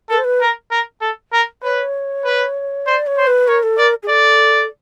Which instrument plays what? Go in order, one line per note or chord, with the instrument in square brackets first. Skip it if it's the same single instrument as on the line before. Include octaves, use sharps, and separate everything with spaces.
[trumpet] A4 [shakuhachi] A#4
[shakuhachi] C5
B4
[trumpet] A#4
A#4
A4
A#4
[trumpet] B4 [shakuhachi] C#5
[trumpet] B4
[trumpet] C5 [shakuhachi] D5
[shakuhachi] C#5
[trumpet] C5
[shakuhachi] B4
[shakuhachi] A#4 [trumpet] C#5
[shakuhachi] A4
[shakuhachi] A#4 [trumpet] D5
[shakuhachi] G#4
[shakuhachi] A4 [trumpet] D5